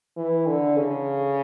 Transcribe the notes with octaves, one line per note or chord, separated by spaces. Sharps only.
E3
D3
C#3